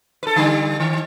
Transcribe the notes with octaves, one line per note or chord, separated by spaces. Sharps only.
A4 B4
D3 G3
D#3